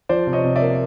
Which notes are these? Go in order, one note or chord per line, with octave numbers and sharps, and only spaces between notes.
F3 C5 D5
C3
C#5 D#5
C3
D5 E5
A#3